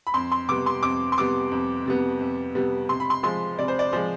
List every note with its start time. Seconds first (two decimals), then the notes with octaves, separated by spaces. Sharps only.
0.07 B5
0.14 F2 C6
0.32 C6
0.49 C3 G3 B3 D6
0.66 C6
0.83 F2 D6
1.12 C6
1.18 C3 G3 B3 D6
1.52 F2
1.86 C3 G3 B3
2.21 F2
2.55 C3 G3 B3
2.89 C3 C6
3.00 B5
3.10 C6
3.23 F3 G#3 C6
3.58 C3 D5
3.68 C5
3.79 D5
3.93 F3 G#3 C5